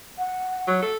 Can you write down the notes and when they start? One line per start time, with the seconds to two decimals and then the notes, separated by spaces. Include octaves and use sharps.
0.18 F#5
0.67 F#3
0.82 A4